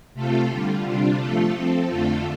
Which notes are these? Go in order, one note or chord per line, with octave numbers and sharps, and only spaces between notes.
C3 A3 F4 A4
D3 G3 F4
C3 G3 D4 F4
F3 A3 F4 A4
F3 C4 A4
F2 D3 A3 F4 A4